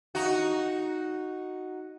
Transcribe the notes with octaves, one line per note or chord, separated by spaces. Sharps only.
D#4 F#4